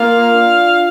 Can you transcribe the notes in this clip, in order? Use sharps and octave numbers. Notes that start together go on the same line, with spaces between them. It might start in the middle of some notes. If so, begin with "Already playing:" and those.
Already playing: A#3 F4 F5
D4